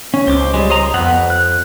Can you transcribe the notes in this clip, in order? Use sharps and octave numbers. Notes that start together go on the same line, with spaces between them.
C#4
C#2 C5 D6
G3 G#3
C5 D#5 A#5
F2 B3 F#5
F#6